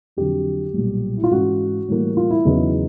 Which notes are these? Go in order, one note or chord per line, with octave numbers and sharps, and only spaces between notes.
F2 D3 F#3 G4
B1 A#2 G3
E4
F4
G#2 E3 G#3 C#4 F#4
A2 E3 G3 A#3
F4
E4
E2 C#3 F#3 B3 D#4